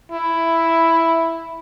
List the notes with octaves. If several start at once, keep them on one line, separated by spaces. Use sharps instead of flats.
E4